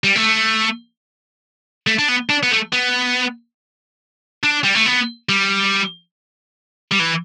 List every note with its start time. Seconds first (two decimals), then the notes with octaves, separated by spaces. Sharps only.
0.04 G3
0.16 A3
1.87 A3
1.99 D4
2.09 B3
2.30 D4
2.43 B3
2.51 A3
2.73 B3
4.43 D4
4.64 G3
4.75 A3
4.86 B3
5.29 G3
6.92 G3
7.00 E3